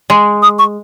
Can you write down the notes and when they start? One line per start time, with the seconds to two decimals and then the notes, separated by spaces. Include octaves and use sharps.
0.10 G#3
0.42 D#6
0.58 C#6